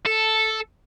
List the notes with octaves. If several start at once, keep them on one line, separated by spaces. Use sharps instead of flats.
A4